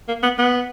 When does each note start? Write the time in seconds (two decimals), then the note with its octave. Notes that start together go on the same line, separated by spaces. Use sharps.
0.08 A#3
0.23 B3
0.38 B3